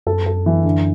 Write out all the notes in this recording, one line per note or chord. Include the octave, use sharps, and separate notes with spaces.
F#2 A4
A4
E3
D3